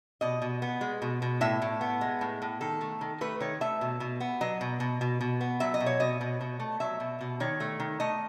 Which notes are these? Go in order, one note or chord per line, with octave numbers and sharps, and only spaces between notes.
B2 D#5
B2
B3
G#3
B2
B2
A2 E5
A2
B3
G#3
A2
A2
D#3 A4
A3
D#3
A3 B4
D#3 C#5
A3 E5
B2
B2
B3
F#3 D#5
B2
B2
B2
B2
B3
F#3 E5
D#5
B2
C#5
B2 D#5
B2
B2
A3
F#3 E5
B2
B2
D#3 C#5
A3
D#3
A3 D#5